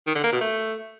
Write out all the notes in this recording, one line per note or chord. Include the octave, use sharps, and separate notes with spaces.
D#3
D3
A#3
B2
A3